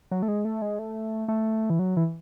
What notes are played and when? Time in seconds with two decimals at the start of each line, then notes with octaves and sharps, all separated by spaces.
0.11 F#3
0.23 A3
0.28 G#3
0.45 A3
0.62 G#3
0.79 A3
1.28 A3
1.70 E3
1.79 F#3
1.97 E3